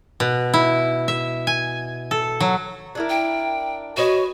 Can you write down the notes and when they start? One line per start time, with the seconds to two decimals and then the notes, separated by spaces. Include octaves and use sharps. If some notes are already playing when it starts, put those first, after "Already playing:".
0.20 B2
0.54 E4
1.08 E5
1.47 G#5
2.11 A4
2.40 F#3
2.95 D4 E4 A#4
3.10 G5
3.97 F#4 B4 C#5 D#5